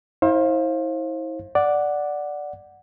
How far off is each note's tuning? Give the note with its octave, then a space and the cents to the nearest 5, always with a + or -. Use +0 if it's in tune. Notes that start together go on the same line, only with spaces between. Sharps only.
E4 -40 C5 +35 F5 +0
D5 +0 F#5 -5